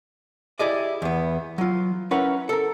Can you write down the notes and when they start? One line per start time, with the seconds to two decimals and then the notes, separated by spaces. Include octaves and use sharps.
0.59 E4 G4 G#4 D5 D#5
1.02 E2 B3
1.58 F#3 F4
2.11 C#4 E4 A#4 B4 C#5 F#5
2.49 A4 A#4